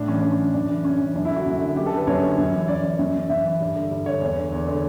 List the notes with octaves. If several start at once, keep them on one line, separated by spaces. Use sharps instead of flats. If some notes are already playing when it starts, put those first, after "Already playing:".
Already playing: A2 D4
E3 C#4
A2 D4
C#4
E3
F#2 D4
C#3 E3
F#2 C#4
C#3 E3
F#2 D4
E4
D3
F#4
F#2
D3
F#2 G4
A4
D3 B4
F#2 C#5
D3
F#2
E3
F#2 D5
E3
F#2
E3
F#2 E5
E3
G2
D3
G2
D3 C#5
E2 C#5
D3
E2
D3